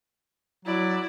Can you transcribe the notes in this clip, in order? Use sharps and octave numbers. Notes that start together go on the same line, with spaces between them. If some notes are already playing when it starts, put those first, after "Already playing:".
F#3 E4 D5